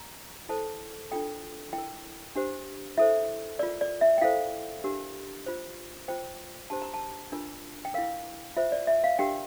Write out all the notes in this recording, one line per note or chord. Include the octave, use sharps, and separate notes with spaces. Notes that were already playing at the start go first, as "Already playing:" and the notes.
Already playing: A#5
E4 A4 C5 A5
D4 F4 A4 G5
E4 G5
A#4
D4 G4 C5
E4 A4 C5 E5
F4 A#4 D5
D5
E5
G5
E4 A4 C5 F5
D4 G4 A#4
F4 C5
F4 C5 G5
D4 G4 C5 A5
A#5
A5
D4 F4 A#4
G5
E4 A#4 F5
F4 C5 E5
D5
E5
F5
D4 G4 A#4 G5